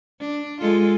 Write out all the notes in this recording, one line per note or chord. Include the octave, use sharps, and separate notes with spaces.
D4
G#3 F4 A4